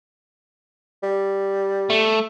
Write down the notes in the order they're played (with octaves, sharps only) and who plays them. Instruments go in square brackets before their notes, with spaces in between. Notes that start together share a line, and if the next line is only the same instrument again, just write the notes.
[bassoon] G3
[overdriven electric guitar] A3